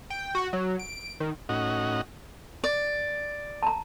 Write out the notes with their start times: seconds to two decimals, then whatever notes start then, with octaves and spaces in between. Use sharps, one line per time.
0.10 G5
0.35 F#4
0.53 F#3
0.79 D7
1.20 D#3
1.49 A2 C#4 D#4 F#4 D#5 F#5
2.64 D5
3.63 A5 A#5